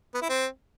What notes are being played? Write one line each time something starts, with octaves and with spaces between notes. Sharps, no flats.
B3
E4
C4